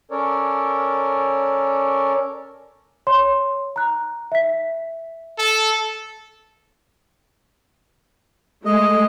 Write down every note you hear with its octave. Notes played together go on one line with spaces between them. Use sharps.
C#4 A4 A#4 C#5 D5
C#5 C6
A#5 F#6
E5 B6
A4
G#3 A3 D#5